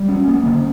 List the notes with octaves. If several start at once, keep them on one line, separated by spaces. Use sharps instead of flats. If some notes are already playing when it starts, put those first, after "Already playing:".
Already playing: G3
C#4
A#3
D3